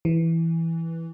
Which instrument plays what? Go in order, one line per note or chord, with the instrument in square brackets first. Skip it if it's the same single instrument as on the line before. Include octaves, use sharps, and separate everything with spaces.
[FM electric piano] E3